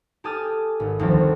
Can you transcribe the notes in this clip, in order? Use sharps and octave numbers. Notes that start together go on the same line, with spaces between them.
G4 A4 G#5 A5 D#6 F6
G#1
D2 D#3 F3 G3 C4